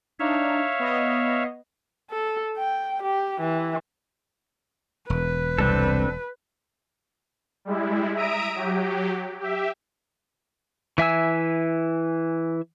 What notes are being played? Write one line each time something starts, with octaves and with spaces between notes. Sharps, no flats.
D4 D#4 C#5 E5 F5
B3 D#5
A4
G5
G4
E3
E1 B4
C2 C4 D4 A4
G3 G#3 E4
E5 A#5 D#6 D7
F#3 G4
G4 E5
E3 E5 G#5 E6